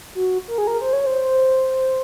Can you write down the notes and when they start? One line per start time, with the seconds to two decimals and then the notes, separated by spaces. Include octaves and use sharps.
0.15 F#4
0.48 A#4
0.58 G#4
0.67 A#4
0.81 C5
0.93 C#5
1.06 C5